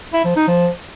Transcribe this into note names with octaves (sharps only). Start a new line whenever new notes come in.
E4
F3
D#4
F3